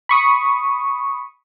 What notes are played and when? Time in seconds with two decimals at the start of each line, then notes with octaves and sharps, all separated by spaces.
0.09 B5 C#6 D#6